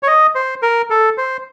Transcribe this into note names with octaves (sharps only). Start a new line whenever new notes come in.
C#5
D#5
C5
A#4
A4
C5